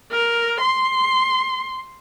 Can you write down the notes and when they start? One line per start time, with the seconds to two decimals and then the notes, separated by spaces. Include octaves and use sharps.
0.12 A#4
0.61 C6